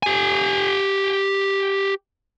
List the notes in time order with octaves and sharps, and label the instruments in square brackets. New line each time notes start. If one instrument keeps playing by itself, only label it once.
[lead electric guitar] G4 G#5